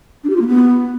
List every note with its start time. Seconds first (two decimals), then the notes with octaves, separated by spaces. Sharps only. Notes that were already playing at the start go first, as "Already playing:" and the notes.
0.24 D4
0.30 G4
0.36 F4
0.41 A#3
0.47 B3